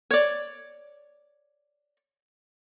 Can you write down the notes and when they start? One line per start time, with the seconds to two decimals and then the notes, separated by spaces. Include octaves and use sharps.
0.11 C#5 D5